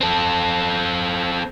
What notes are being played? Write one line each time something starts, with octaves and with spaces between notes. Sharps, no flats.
C4 A4